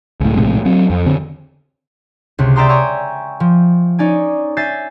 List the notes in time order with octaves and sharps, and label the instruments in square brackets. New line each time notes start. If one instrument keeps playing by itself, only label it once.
[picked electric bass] C#2 A2
A#1 A2 C3 G#3
F#3 C4
F2
D3 C4
[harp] C#2 C3
D5 E5 G5 A#5 C6 D#6
G5 G#5 A#5 C#6 E6
F3
C#4 D#4 D5 G#5
E5 G#5 G6 A6 C7